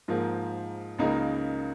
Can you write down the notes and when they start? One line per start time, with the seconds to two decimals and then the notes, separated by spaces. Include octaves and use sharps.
0.08 G#2 F3 A#3
0.99 C#2 C#3 A#3 D#4 A#4